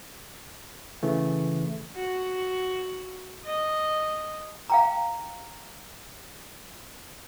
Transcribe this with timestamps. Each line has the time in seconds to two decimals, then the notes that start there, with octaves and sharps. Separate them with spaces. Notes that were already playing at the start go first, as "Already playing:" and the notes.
1.03 C#3 E3 A3
1.96 F#4
3.45 D#5
4.70 F5 G5 A#5